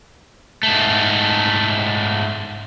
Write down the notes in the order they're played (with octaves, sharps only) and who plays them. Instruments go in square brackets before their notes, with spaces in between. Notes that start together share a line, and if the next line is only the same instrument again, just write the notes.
[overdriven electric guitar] G#2 A3